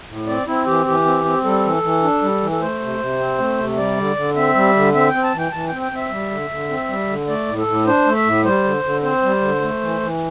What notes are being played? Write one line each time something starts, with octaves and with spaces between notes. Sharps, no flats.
A2
C4 D5
C4 E4
E3 G4
E3 G4
C4
C4
G3 A4
E3
E3
D4
G3
E3
A4
A3 C5
C3
C3
C4
A3
C3
G3 D5
D3
D3
C4 E5
G3
D3
C4 E5
C4 G5
A5
E3
G5
E3 A5
C4 G5
G5
C4 E5
G3
D3
D3
C4
G3
D3
A3 D5
A2
A4
A2
D4 C5
A3
E5
A2
G3 C5
D3
D3
C4 C5
G3
D3
A3
E3
E3